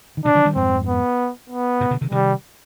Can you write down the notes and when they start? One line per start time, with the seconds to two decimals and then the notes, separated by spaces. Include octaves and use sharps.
0.17 D#3
0.25 B2 D3 D4
0.35 D3 F3
0.45 D#3 G3
0.56 F2 G#2 C4
0.87 B3
1.50 B3
1.81 G#2 C3
1.91 B2 D3
2.01 C3 D#3
2.11 C3 D#3 G3